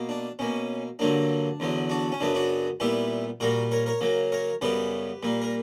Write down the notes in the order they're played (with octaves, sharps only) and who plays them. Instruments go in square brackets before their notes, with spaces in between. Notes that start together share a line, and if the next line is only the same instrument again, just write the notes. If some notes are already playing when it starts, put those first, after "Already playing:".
Already playing: [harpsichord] B2 A#3
D4
B2 A#3 C#4
G2 D3 F#3 A#3 D4
E2 D3 F#3 B3
D4 F#4
C#4
F#2 C#3 F#3 B3 D4
D4 F#4
A#2 G3 B3 E4 G4
A#2 G3 A#3 F#4 A#4
A#4 C#5
A#4 C#5
C#3 F#3 A#3
A#4 C#5
F#2 C#3 G3 B3 G4 B4
A#2 G3 A#3
A#4